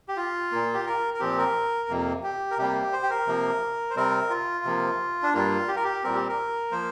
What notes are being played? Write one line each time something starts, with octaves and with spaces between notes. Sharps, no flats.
G4
F4
A#2 A#3
G4
A#4
A#4
A#2 F3 C4 G4
A#4
F2 C3 A#3
G4
A#4
C3 G3 A#3 G4
C5
G4
A#4
C3 F3 A#3
C5
C3 G3 C4 A#4
F4
C3 F3 A#3
D4
G2 G3 A#3 F4
G4
A#4
G4
A#2 G3 C4 A#4
G4
A#4
F3 A#3 C5